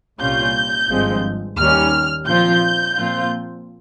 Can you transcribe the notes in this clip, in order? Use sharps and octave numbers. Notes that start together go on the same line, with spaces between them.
C2 A#2 G3 C#4 F4 G6
G#1 G2 F3 G#3 C4
D#2 D#3 G3 C#4 F6
A#2 F3 C4 F4 G6
A#2 F3 C4 F4